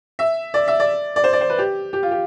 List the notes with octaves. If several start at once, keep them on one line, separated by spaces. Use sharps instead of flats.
E5
D5
E5
D5
D5
C5
D5
C5
B4
G4
G4
F4
G4